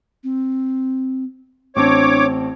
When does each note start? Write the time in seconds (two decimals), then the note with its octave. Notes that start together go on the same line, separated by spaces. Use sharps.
0.24 C4
1.76 A1 C4 D4 C#5 A5 D6